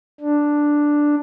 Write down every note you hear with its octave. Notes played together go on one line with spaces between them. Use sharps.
D4